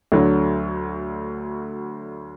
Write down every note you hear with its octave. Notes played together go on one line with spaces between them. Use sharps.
D2 D3 F#3